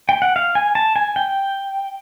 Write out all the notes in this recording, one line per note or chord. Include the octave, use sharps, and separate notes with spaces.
G5
F#5
F5
G#5
A5
G#5
G5